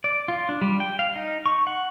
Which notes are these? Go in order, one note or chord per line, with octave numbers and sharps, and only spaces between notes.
D5
F4
D4
G3
G5
F5
D#4
C#6
F#5